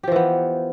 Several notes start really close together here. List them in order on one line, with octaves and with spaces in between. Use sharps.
G4 F3 E3 B3